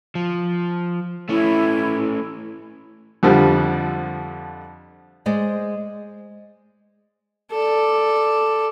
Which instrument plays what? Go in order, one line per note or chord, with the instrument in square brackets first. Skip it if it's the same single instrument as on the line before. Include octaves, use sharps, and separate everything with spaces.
[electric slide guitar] F3
[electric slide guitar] A3 C#4 [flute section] E4
[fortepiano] F2 D3 F3 G3
[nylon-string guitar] G#3 C5 D5 D#5
[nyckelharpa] A4 D5